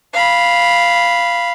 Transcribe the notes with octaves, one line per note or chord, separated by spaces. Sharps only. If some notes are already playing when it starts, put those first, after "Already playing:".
F5 B5